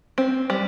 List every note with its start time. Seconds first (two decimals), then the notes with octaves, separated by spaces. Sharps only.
0.18 C4
0.50 G3